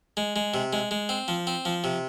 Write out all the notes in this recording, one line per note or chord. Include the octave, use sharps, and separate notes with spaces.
G#3
G#3
C3
G#3
G#3
C4
F3
C4
F3
C3